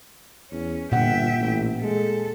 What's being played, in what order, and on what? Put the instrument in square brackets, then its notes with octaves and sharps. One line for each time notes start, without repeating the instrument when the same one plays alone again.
[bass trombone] E2 [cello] C#4
[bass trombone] G1 [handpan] A#2 F#5 [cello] E5 G5
[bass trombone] A1
[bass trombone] G#3 [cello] A4